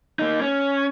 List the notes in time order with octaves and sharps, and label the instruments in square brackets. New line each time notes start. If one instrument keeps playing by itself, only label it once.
[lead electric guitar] A#3 D#4
C#4